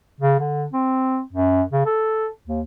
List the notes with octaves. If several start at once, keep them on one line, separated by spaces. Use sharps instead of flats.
C#3
D3
C4
F#2
C#3
A4
D#2